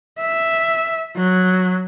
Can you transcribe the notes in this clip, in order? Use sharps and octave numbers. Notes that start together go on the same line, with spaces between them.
E5
F#3